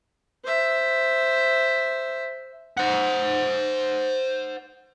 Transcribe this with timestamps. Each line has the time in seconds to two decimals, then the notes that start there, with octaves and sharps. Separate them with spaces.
0.44 C5 E5
2.77 C5 F#5